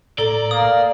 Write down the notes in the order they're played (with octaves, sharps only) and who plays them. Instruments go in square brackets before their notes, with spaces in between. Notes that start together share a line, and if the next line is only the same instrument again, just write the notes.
[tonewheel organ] A2 A#5 A#6 [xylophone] A4 G7 [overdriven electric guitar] D5
[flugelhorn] A#3 [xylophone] D#6